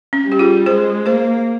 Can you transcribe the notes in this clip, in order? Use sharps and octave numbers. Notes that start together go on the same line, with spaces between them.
C#4
G3
G4
F4 G#4
G#3 G#4 C5
A#3 G#4 C5